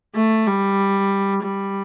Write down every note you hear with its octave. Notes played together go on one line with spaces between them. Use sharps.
A3
G3
G3